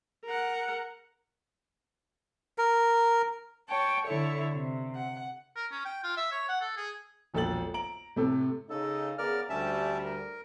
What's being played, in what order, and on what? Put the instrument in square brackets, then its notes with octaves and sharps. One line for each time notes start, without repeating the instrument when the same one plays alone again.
[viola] A#4 F#5
[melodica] A#4
[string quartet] C#5 G5 A5
D3 E4 A4 C#5
C3
F#5
[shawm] A#4
C#4
G5
F4
E5
C#5
F#5
A4
G#4
[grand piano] E1 A#1 A4 G5 A6 F#7
A#5 D7 F#7
A2 C3 A4
[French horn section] C#3 D#4 [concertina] A4
[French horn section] C#3 B3 [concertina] A#4 D5 F6
[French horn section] D2 G3 [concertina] C#4 E5 A5
[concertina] A#4